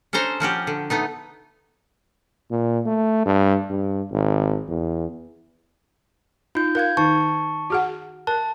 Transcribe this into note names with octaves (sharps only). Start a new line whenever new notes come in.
C#4 D4 A4 C5 A#5
F3 C#4 F#4 G4
D3
A3 B3 D#4
A#2
A3
G2
G2
G#1
E2
D#4 F4 G6
A#4 F5 G6 G#6
D#3 D#4 A5 C#6
F#4 G#4 F#5
A#4 A5